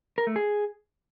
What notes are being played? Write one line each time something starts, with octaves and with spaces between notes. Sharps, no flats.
A#4
A3
G#4